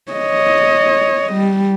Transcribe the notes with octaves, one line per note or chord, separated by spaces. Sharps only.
C#5 D#5
G3